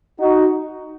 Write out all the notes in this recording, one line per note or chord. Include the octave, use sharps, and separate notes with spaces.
D#4 F#4